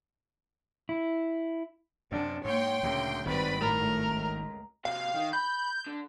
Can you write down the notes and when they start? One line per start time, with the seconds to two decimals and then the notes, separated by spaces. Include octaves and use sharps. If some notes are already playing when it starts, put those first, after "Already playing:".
0.89 E4
2.12 F#2 C3 D4
2.45 G#2 A#3 C#5 G5 C6
2.83 D2 A#2 C#3
3.26 G#1 G2 D#3 C4 B4 D5 B5
3.60 A2 A3 A#4
4.09 C#2
4.85 C3 F#4 F5
5.14 D#3 D#4
5.33 B5 G6
5.86 D3